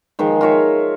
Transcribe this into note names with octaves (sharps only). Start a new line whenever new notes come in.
D#3 F3 G#3
F4 A#4 C#5 E5